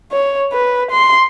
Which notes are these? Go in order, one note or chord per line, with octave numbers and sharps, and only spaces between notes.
C#5
B4
C6